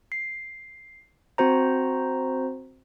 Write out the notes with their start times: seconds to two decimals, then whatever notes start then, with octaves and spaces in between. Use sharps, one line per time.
0.12 C7
1.38 C4 F#4 C5 A#5